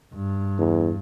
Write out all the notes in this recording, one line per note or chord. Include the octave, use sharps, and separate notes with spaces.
G2
E2